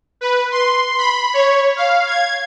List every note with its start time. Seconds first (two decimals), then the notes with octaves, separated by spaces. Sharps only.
0.21 B4
0.52 C6
0.98 B5
1.34 C#5
1.77 F5
2.07 G#6